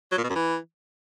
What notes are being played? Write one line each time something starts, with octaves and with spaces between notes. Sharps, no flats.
F#3
A#2
B2
F#2
E3